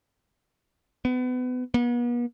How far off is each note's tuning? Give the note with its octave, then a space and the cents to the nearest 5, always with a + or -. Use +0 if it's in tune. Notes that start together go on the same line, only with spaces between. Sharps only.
B3 +30
B3 -40